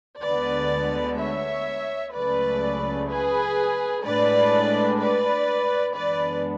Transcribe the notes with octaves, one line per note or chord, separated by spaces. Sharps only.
D2 D3 G#3 B3 B4 D5
C#5 E5
C#2 C#3 F#3 A3 B4 D5
G#4 B4
A2 G#3 D4 B4 D5
B4 D5
F#2 E3 G#3 B3 D4 B4 D5